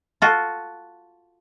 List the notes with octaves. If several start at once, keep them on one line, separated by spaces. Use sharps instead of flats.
F4 F#4 A4